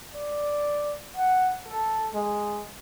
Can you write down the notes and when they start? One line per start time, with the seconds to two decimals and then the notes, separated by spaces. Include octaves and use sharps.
0.15 D5
1.17 F#5
1.68 A4
2.14 G#3